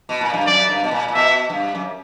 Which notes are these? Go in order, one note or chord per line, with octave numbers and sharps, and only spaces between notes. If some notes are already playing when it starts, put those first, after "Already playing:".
B2
A#2
G2
F#2 D5
G2
B2
A#2
A#2
B2 E5
G2
F#2